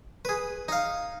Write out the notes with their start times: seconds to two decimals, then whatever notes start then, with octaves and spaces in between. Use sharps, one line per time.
0.25 G#4 B4
0.68 D#4 F5